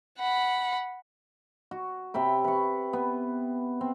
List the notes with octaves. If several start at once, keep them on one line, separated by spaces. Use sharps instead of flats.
F#5 B5
F#4
C3 E5 G5 B5
B4 C#6
B3
C4